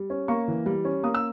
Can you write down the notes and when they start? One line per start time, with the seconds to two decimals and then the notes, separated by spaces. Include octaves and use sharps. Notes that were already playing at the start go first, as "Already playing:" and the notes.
Already playing: G3
0.10 C#4
0.28 A#3 C#6
0.48 E3
0.66 G3
0.85 C#4
1.03 A#3 D#6
1.14 E6